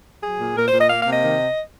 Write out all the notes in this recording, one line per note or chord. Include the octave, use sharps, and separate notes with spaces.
F#3 G#4
A#2
A#2 A#4
A#2 C5
D#5
A#3 F5
C3 F5
D#5
D#3